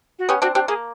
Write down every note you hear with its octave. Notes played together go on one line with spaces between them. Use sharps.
F#4
B3 C#4 G4
C4 D4 F#4
C4 D4 G4
A#3 G#4